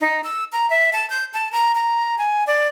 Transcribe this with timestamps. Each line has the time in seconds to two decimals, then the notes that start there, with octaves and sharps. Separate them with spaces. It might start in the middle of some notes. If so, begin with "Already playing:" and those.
0.01 D#4
0.24 E6
0.52 A#5
0.70 E5
0.93 A5
1.10 G6
1.34 A5
1.52 A#5
1.75 A#5
2.18 G#5
2.47 D5